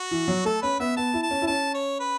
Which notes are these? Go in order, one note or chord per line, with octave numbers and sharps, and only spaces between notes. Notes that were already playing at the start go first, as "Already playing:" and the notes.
Already playing: F#4
E3
F#3
A3 A4
C#4 B4
B3 E5
B3 A5
E4
A5
C#4
E4
C#4 A5
C#5
B4